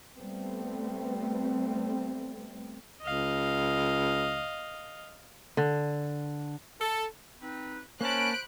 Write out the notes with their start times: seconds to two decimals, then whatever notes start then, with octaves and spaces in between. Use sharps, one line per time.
0.16 G3 A3 B3 C4
3.02 C#2 D#5 F5
5.57 D3
6.81 A4
7.41 C4 D#4 B4
8.01 A#3 C#4 C5 A5 B5 F#6 D7